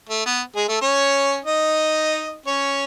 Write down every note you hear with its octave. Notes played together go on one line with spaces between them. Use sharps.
A3
B3
G#3 G#4
A3 A4
C#4 C#5
D#4 D#5
C#4 C#5